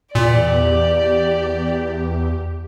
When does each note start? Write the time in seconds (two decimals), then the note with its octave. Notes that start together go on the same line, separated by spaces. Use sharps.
0.15 E2 A#2 G4 D5